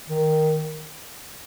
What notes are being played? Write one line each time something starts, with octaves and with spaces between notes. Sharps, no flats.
D#3